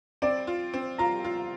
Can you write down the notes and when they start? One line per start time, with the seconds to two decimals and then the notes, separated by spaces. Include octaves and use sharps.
0.22 C4 D5
0.47 F4
0.74 C4
0.98 F4 A#5
1.25 F4